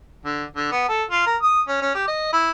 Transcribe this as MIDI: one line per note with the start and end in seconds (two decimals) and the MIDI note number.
0.25 0.44 50
0.56 0.67 50
0.72 0.85 59
0.89 1.03 69
1.11 1.25 65
1.26 1.37 70
1.42 1.62 87
1.68 1.78 61
1.82 1.90 61
1.95 2.05 67
2.08 2.30 75
2.33 2.51 64